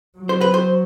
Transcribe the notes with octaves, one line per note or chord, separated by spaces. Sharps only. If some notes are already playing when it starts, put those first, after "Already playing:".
F#3
C5
B4
C5